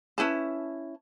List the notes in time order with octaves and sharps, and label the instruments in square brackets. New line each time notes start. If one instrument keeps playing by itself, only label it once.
[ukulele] C#4 E4 B4 A5